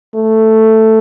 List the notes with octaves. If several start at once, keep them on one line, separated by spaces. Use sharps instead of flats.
A3